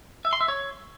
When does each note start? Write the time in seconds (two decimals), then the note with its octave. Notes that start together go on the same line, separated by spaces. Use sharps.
0.25 E5
0.33 C6
0.41 E5
0.48 C#5